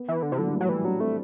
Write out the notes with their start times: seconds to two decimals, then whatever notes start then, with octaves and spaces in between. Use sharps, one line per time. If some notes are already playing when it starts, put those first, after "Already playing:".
Already playing: B3
0.08 E3
0.23 D3
0.31 C3 E3
0.38 D3 F#3
0.46 G3
0.54 A3
0.61 F#3
0.69 E3 G3
0.84 F#3 D4
1.00 A3 C4